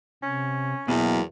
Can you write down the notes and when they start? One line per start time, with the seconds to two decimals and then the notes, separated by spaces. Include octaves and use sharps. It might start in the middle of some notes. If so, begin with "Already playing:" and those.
0.23 C3 C#4
0.88 E2 B2 F#3 A#3 E4